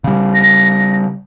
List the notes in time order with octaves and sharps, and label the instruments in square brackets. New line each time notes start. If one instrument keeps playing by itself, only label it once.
[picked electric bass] C#3 G3
[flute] A#6